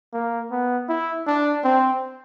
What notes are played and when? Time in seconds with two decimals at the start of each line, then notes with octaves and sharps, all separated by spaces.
0.13 A#3
0.51 B3
0.89 E4
1.27 D4
1.64 C4